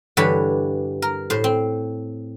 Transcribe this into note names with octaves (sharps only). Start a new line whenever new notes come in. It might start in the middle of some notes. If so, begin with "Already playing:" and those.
G2 D3 E3 C#5 B5
A#4
A2 C5
C4